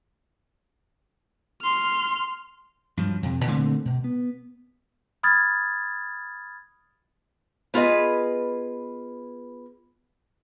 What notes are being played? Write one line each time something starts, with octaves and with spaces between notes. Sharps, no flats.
C6 F6
G2 F3 F#3
F2 C3
A#2 D3 A3 C4
B2
B3
B5 D#6 F6 G#6 A6
B3 F4 G#4 B4 D#5